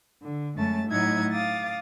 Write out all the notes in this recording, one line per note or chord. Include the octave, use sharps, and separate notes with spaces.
D3
F#2 G#3 A3 C#4 A5 A6
A2 F#3 D#4 E5 F#5 G#6
F5 D6 D#6 A6